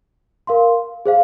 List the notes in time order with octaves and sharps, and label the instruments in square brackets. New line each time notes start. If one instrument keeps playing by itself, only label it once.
[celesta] A#4 F5 C6
G#4 C5 F5